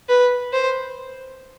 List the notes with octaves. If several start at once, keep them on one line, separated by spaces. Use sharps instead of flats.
B4
C5